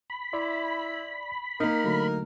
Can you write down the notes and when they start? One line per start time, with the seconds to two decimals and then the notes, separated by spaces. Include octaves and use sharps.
0.10 B5
0.33 E4 D5 C6
1.60 A#3 D#4 A#4
1.84 D3 F#3 A3